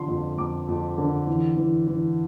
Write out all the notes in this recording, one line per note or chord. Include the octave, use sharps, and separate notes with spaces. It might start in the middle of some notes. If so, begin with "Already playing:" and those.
Already playing: D3 F3 C6
F2
F2 D6
F2
D3
E3
E3
E3